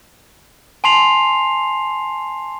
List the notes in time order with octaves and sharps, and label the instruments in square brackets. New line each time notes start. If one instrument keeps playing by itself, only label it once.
[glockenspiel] G#5 A5 C6 C7 F7